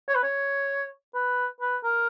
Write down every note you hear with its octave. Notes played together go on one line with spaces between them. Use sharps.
C#5
B4
C#5
B4
B4
A#4